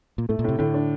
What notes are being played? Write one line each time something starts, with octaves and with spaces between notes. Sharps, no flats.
A#2
A2 A3
A#2
A2 C3
A2 D3
D4